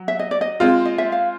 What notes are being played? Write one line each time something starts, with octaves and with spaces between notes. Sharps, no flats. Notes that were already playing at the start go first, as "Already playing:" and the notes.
Already playing: F#3
E5
D#5
D5
D#5
G#3 C4 F4
D#5
E5
F5